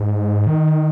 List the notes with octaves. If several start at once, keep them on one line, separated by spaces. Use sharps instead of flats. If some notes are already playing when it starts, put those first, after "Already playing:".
Already playing: G#2
D#3